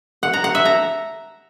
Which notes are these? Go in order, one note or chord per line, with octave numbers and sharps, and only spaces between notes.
F#5
A#5
F#5
E5
A#5